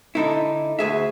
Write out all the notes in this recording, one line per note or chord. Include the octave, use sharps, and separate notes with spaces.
D3 D#4 E4
D2 G#4 E5